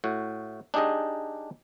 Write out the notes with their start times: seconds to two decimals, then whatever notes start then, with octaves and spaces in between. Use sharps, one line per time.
0.04 A2 F#4
0.74 D4 D#4 G4 G#4 D5 D#5